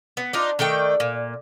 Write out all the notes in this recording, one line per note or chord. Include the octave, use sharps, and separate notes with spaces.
B3
D4 D#4 F4
D#3 A3 D5 G5
A#2